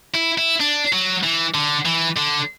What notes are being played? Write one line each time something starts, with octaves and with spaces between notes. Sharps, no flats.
E4
E4
D4
F#3
E3
D3
E3
D3